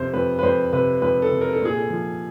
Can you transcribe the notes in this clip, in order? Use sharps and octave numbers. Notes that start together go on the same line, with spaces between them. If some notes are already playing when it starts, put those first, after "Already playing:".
Already playing: F2 C3 C5
F2 B4
B4
F2 C5
C3 B4
F2 B4
A4
C3
A#4
A4
A#2 G#4
A4
F3